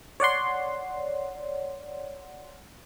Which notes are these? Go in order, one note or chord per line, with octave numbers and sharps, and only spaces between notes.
C#5 D5 F#5 C6